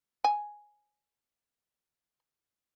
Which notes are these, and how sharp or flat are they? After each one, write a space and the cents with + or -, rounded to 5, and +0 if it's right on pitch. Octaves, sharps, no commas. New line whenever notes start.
G#5 +5